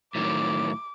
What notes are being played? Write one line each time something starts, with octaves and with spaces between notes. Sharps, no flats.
A2 D#3 F#3 D6